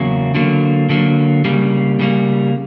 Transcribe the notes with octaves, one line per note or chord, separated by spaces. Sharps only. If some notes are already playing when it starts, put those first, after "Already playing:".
Already playing: E2 C#3 F#3 A#3
D3 F#3 A#3
D3 F#3 A#3
C#3 G3 A#3
C#3 G3 A#3